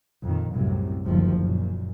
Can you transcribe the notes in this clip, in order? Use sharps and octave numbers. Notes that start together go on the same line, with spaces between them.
F2 A#2 D#3
C2 F#2 A2 C3
F#1 D2 G2 D#3 F3
F#2 A#2